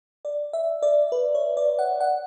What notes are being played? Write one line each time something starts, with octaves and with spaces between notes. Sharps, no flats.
D5
E5
D5
B4
C#5
D5
F#5
F#5